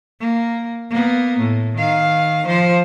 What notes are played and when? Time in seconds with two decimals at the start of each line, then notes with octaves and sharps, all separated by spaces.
0.20 A#3
0.90 A#3 B3
1.39 A2
1.77 D#3 F5
2.47 F3 C5